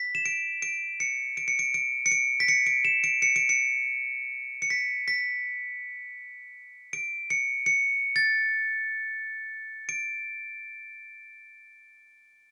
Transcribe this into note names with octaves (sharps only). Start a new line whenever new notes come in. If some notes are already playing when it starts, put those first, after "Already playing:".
Already playing: B6
E7
D7
D7
C#7
D7
C#7
D7
D7
C#7
D7
B6
C#7
D7
E7
D7
C#7
D7
C#7
C#7
B6
B6
D7
C#7
C#7
A6
D7